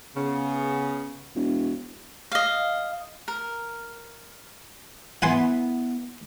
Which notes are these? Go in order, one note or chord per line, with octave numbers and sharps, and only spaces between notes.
C#3 B3
E1
D#5 F5
A#4
B3 E4 F#5 G#5 C6